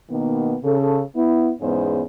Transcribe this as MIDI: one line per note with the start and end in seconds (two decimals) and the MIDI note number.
0.10 0.55 47
0.10 0.55 51
0.10 0.55 58
0.10 0.55 59
0.64 1.01 49
0.64 1.01 69
1.16 1.52 59
1.16 1.52 64
1.61 2.02 40
1.61 2.02 44
1.61 2.02 59
1.61 2.02 61
1.61 2.02 68
1.61 2.02 72